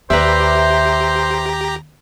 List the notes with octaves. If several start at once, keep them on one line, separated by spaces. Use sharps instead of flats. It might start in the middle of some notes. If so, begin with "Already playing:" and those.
D#2 G4 B4 C5 D5 E5 A#5